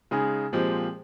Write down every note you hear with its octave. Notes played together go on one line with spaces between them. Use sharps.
C#3 G#3 D#4 G#4
A#2 F3 G#3 C4 G4